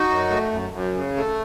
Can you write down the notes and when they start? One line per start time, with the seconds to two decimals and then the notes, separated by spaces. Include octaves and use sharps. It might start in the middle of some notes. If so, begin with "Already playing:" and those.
Already playing: D#4 F#4
0.09 F#2
0.30 A3
0.51 F#2
0.73 F#2
0.94 C#3
1.17 A3